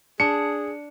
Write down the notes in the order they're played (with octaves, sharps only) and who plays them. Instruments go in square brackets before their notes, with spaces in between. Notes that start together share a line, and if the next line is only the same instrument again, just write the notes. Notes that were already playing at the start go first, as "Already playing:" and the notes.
[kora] D4 [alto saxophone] G#4 [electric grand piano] C#7